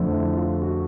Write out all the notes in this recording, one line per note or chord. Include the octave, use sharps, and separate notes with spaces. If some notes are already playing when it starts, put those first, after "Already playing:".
Already playing: F2 D3 F3 A3
E4
F4
F#4